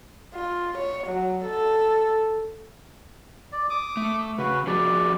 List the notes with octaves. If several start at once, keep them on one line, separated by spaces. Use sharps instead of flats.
F4
C#5
F#3
A4
D5
D6 D#6
A3
C#3 F#4 B4
F3 F#4 G#4 D5